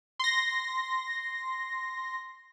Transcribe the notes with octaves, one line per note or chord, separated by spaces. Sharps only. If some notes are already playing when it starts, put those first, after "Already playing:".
C6 A#6